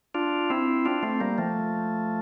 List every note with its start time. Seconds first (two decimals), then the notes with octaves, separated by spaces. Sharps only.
0.15 D4 F4
0.50 C4 E4
0.85 D4 F4
1.03 A3 C4
1.20 G3 A#3
1.38 F3 A3